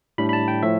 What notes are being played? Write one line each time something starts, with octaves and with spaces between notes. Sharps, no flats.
A2 G3 D4 B5
B5
A5
G5
A2 F3 E5